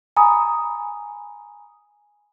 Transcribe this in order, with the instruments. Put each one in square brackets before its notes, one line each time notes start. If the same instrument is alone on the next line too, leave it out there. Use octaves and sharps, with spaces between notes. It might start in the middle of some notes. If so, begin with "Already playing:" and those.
[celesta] G#5 A#5 B5 D#6